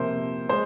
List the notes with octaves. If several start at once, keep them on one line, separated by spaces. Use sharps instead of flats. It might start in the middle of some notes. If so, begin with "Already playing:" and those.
Already playing: C3 F3 A#3 C5
G#3 C5